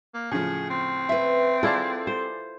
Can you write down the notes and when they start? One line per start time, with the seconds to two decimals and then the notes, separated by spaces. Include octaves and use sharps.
0.14 A#3
0.31 A2 C#3 F3 G#4
0.70 C4
1.09 B4 E5
1.63 E4 F4 G#4 A4 D5 A5
2.07 C5